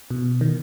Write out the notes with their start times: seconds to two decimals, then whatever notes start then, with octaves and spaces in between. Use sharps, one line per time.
0.11 B2
0.41 D#3